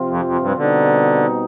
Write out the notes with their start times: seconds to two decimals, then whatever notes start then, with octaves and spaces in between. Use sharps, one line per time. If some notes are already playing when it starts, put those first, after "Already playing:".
Already playing: C3 F3 C4 F4
0.10 F2
0.26 F2
0.42 G2
0.58 B2 D3 G3 C4 D#4